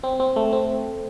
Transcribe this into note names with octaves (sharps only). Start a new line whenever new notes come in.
C4
C4
A3
C4